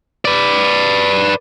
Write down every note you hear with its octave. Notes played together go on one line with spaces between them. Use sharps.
B4 D5